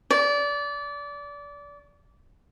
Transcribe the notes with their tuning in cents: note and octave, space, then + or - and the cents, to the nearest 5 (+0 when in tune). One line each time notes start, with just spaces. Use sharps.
D5 -25